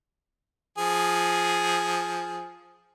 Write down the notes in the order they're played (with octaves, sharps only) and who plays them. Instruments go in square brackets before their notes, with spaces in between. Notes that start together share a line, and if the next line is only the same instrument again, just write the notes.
[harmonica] F3 G#4